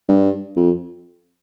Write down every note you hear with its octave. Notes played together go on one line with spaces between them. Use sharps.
G2
F2